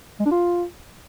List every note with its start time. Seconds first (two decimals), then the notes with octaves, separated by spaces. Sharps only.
0.20 G#3
0.26 D4
0.32 F4